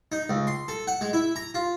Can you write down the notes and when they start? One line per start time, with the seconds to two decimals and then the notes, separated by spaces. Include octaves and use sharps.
0.12 D#4
0.30 C#2
0.47 C6
0.68 A4
0.87 F#5
1.01 G#3
1.13 E4
1.36 A#5
1.55 F4